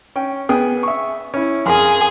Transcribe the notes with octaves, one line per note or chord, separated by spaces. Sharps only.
C#4 G5
B3 G#4 G5
E5 C#6
C#4 E4
F2 G#4 A#4 C6